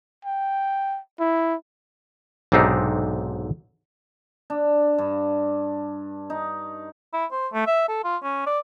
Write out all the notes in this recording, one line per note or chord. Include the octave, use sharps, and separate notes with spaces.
G5
E4
B1 G#2 C3 C4 D4 D#4
D4
G2
D#4
E4
C5
A3
E5
A4
F4
C#4
D5